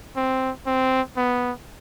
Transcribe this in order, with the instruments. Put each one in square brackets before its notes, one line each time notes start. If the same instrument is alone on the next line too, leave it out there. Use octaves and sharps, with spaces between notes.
[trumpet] C4
C4
B3